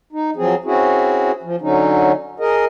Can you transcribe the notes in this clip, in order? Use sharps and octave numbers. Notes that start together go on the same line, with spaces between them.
D#4
F3 F#3 C4 G#4
C4 C#4 E4 F#4 G#4
F3
D3 F#3 C#4 D#4
G#4 A#4 D#5